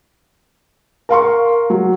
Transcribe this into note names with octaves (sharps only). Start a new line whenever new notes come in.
A#4 F5 C6 C#6
F#3